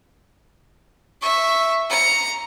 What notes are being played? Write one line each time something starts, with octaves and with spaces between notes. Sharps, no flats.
E5 C#6
A#5 C#7